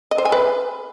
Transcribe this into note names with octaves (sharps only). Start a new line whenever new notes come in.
D#5
C5
G#5
B4